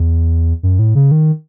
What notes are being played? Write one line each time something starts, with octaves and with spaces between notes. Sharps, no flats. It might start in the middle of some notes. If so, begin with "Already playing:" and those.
Already playing: E2
F#2
A2
C#3
D#3